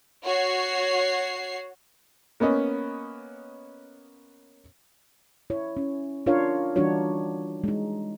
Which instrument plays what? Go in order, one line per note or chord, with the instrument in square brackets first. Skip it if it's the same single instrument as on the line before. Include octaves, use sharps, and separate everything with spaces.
[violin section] F#4 C#5 C7
[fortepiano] A#3 B3 C#4 D#5
[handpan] E4 C#5
C#4
D4 F4 A#4 C#5 F5
E3 G3 D4 D#4 F#4 C#5
G#3 D#4